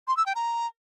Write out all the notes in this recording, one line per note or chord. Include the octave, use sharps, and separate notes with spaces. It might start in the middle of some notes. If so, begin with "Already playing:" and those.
C6
E6
G5
A#5